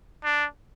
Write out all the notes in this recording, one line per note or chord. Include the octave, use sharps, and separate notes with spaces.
D4